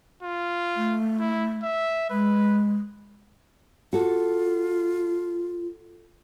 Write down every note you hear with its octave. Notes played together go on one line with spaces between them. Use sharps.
F4
A3
E4
E5
G#3 B4
F4 F#4 A4